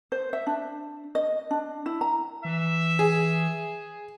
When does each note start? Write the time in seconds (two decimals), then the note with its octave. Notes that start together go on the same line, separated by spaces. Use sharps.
0.12 C5
0.33 E5
0.47 D4
1.15 D#5
1.51 D4
1.86 E4
2.01 A#5
2.45 E3 E5
2.99 G#4